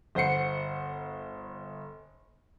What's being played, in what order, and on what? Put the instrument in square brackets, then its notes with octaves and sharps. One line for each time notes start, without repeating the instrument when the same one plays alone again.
[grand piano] G1 C5 F#5 C7 C#7